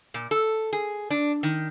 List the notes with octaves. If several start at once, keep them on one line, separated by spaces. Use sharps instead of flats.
A#2
A4
G#4
D4
D#3